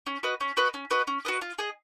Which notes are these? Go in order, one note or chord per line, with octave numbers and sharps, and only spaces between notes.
C#4
F#4 B4 D#5
C#4
F#4 B4 D#5
C#4
F#4 B4 D#5
C#4
F#4 B4 D#5
F4
G#4 D#5